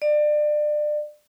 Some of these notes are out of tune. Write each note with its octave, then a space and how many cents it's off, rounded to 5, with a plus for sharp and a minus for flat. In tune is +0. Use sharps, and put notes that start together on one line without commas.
D5 +30